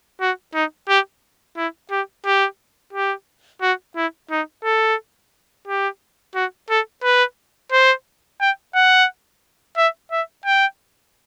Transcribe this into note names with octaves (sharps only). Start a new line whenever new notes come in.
F#4
D#4
G4
E4
G4
G4
G4
F#4
E4
D#4
A4
G4
F#4
A4
B4
C5
G5
F#5
E5
E5
G5